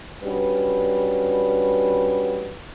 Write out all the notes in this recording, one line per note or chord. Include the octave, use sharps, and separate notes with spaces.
G3 C#4 D4 F#4 B4